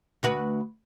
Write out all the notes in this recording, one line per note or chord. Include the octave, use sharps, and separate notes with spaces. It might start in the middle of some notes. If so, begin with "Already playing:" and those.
D2 F#4 B4